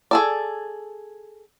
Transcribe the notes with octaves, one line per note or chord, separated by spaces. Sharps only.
G#4 A4 D5